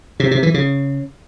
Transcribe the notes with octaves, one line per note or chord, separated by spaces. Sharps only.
C3
C3
E3
C#3